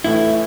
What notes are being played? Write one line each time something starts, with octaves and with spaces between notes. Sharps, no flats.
A2 E3 A3 E4